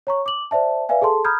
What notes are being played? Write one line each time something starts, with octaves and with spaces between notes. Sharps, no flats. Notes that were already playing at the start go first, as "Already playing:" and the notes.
C#5 A#5 C#6
D6 F#7
C5 D5 E5 A5
B4 D5 E5 F5 G#5
G#4 A4 A5 C6
A#5 B5 D#6 F6 G6 G#6